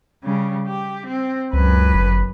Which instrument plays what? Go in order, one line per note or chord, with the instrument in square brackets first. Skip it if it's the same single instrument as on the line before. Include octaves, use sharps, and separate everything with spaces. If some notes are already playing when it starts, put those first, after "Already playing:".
[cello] C#3 G3
G4
C4
[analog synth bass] C#2 [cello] F#2 B4
[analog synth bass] G1